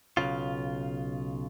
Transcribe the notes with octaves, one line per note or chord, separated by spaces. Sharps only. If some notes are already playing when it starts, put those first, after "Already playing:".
B1 E2 C#3 F4